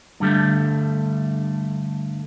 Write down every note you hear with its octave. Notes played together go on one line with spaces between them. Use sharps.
G2 D3 G3 A3